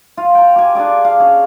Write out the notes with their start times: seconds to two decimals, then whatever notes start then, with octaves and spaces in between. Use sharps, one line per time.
0.17 F4
0.35 G5 A#5
0.56 G4 G#5
0.75 D4 F4 G#4 D5
1.05 F5
1.20 C#4 G#4